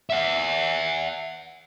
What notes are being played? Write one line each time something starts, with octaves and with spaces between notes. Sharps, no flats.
E5 F#5